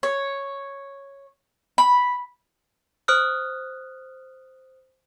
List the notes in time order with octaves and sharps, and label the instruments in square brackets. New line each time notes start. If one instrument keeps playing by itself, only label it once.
[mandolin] C#5
B5
[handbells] C5 D#6 F6 F#6